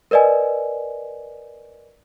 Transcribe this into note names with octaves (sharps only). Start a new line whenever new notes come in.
A#4 B4 D5 D#5 G#5